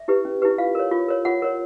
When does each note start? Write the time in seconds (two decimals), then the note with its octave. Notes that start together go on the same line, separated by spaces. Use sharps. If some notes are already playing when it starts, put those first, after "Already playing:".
Already playing: E5
0.08 E4 G4 B4
0.25 C#4
0.42 E4 G4 B4
0.58 F4 F5
0.75 A#4 C#5
0.91 F4
1.08 A#4 C#5
1.25 F4 F#5
1.42 A#4 C#5